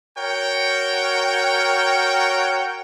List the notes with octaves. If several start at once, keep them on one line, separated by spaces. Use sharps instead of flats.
F#4 A#4 C#5 G5